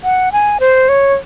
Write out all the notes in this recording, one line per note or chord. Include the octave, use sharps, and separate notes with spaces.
F#5
G#5
C5
C#5